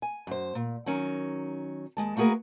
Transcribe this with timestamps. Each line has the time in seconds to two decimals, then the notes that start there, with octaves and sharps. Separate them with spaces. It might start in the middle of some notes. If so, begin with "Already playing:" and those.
0.02 G#5
0.27 F#2 C5
0.55 A#2
0.86 D#3 F#3 C#4
1.97 D#2 G#3 A5
2.17 A3 A#3 F#4 G#4 A#4 B4